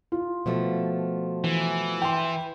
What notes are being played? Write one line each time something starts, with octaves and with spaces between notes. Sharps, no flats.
F4
B2 F3 A3
E3
G5 C6